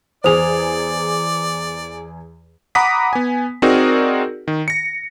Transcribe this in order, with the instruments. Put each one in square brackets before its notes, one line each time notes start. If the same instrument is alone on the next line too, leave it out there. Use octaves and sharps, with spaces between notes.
[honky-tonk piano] E2 G#4 [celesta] C5 D#6 F7 [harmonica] D5
[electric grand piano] F#5 A#5 B5 D6 D#6 B6
B3 G#5
C4 D#4 F#4 G#4 A#4 D5
D#3
A#6 C#7